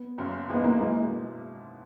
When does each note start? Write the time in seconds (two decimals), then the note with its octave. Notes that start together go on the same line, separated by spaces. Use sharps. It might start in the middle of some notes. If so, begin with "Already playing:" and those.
Already playing: B3
0.18 F#1 F#2 C#3 F#3
0.50 G#1 G#2 E3 G#3 B3
0.64 A#3
0.80 B2 G#3 A#3 E4